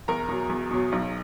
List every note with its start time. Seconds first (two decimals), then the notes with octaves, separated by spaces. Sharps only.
0.08 E2 A#4 A#5
0.29 B2 F#3
0.50 E2
0.71 B2 F#3
0.92 B1